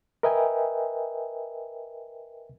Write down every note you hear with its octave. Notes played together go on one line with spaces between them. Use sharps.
A#4 B4 D#5 E5 G5 G#5